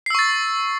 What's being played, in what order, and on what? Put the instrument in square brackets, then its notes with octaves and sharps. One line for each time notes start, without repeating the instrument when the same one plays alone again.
[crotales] C7
E6
C#6
A6